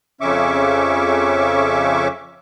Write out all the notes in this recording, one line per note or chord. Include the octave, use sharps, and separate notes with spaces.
F2 C#3 C#4 E5 C#6 D6